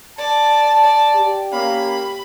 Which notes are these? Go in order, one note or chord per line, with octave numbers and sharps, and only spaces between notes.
D5 A5
D5
G4
A#3 C#4 F5 B5